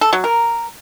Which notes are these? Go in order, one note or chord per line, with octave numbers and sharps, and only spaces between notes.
A4
F#3
A#4